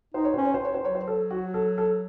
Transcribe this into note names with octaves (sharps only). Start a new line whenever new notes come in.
D#4 C5
C#5
C#4 C5
C#5
C5
C#5
C5
F#3 C#5
C5
A4
F#4
A4
A4